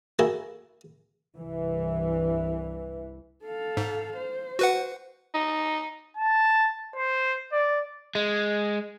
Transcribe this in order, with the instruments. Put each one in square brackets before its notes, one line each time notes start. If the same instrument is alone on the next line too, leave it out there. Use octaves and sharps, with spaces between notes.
[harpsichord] A#3 E4 F#4 G#4 A4 G#5
[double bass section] C2 G2 E3
[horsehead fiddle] A4 F5
[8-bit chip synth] G#2
[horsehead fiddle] C5
[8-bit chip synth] F#4 B4 F#5
[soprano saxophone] D#4
[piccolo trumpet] A5
C5
D5
[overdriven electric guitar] G#3